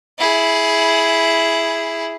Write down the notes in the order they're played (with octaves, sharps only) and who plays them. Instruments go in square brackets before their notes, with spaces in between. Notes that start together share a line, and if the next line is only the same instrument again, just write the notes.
[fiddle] E4 G#4